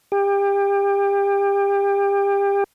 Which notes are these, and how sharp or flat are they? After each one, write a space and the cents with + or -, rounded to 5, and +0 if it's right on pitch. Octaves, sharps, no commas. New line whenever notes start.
G4 +30